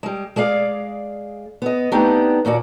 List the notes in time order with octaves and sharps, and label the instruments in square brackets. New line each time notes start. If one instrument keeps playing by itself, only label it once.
[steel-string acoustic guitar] G3 G#3
G#3 G#4 D5 F5
B3 D#5
A3 B3 C4 D4 D#4 G4
D#2 A#2 F#4 D5